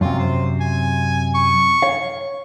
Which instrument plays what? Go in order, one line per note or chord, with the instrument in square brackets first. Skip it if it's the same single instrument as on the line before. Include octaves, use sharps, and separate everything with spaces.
[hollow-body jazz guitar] F#2 C3 [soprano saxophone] F4
[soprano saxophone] C5
G#5
C#6
[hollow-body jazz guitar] C#5 F5